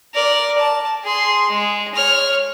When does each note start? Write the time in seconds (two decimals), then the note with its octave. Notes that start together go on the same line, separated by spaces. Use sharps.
0.14 A#4 D5
0.58 A5
1.04 G#4 C6
1.50 G#3
1.94 C#5 F6